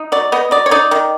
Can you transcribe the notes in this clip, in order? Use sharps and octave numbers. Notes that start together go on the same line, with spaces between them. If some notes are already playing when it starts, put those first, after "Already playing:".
Already playing: D#4
F#3 D5
B3 D#5
F#3 D5
C#5
D#4 D5
D#3